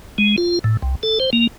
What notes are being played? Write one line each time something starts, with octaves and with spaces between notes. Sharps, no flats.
G#3
F4
A2
C2
A4
C5
A#3